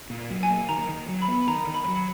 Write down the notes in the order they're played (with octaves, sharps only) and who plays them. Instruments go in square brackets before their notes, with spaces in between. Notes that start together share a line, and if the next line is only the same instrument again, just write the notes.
[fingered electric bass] A#2
F#3
[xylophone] G#5
[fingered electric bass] A#3
[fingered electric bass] D#3 [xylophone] A#5
[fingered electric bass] D#3
F#3
[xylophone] B5
[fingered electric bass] B3
[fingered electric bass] D#3 [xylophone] A#5
[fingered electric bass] D#3
[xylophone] B5
[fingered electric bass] F#3